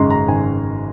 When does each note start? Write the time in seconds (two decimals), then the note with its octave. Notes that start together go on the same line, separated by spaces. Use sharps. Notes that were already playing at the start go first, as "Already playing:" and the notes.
Already playing: G#1 F#2 C#3 G#3 A#5 C6
0.10 A#5
0.28 G#1 G#5